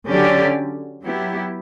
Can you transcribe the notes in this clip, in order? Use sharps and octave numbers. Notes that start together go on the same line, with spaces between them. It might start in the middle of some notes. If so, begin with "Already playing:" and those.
D3 F#3 C#4 G4 D5
F#3 B3 E4 G4